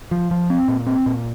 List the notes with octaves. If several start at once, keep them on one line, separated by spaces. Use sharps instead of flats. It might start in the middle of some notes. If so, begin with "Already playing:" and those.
F3
F3
C4
A#2
C4
A#2